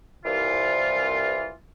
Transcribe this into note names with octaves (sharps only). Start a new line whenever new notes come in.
C2 E3 F4